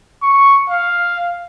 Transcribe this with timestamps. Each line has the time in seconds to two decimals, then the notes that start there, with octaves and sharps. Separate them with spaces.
0.22 C#6
0.70 F5